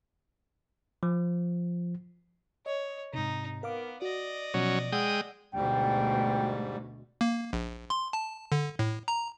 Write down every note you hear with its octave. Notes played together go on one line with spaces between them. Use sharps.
F3
C#5 D#5
G#2 C3 D#4
B3 A#4 F5 D6
F#4 D5 D#5
B2 F3 F#3 C#4
G#3 F#5 G5 D#6 E6
D2 G#2 B2 G3 G5
A#3
A#1
C6
A5
D3
A2
A#5